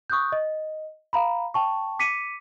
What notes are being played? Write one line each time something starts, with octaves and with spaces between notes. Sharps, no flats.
C#6 D#6 F#6 G6
D#5
F5 A#5 B5
G5 A5 C#6
D6 B6 C#7 D#7